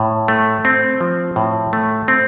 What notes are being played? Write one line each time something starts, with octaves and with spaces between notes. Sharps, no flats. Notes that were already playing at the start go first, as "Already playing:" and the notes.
Already playing: A2
A3
C4
F3
A2
A3
C4